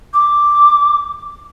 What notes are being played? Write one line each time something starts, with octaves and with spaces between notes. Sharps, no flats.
D6